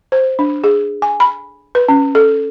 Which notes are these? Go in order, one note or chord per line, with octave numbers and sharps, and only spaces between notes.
C5
D4
G#4
G#5
B5
B4
C#4
A4